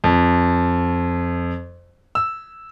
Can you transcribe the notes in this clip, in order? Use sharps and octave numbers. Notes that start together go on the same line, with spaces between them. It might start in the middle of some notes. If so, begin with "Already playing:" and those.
F2
E6